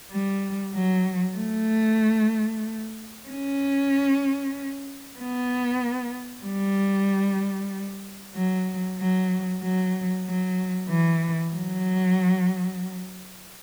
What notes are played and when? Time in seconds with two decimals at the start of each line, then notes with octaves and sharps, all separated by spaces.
0.11 G3
0.74 F#3
1.38 A3
3.29 C#4
5.19 B3
6.45 G3
8.35 F#3
8.99 F#3
9.62 F#3
10.26 F#3
10.89 E3
11.54 F#3